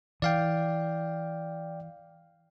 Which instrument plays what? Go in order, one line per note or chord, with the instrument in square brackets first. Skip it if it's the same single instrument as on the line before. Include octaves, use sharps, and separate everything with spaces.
[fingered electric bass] E3 [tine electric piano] D5 F5 G5